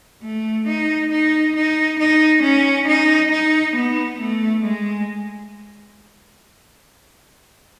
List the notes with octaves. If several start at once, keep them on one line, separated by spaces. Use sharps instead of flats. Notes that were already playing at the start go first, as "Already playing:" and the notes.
A3
D#4
D#4
D#4
D#4
C#4
D#4
D#4
B3
A3
G#3